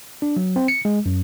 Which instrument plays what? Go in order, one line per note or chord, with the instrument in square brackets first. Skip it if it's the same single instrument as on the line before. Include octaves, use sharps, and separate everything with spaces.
[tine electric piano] D4
F#3
C4
C#7
G#3
F#2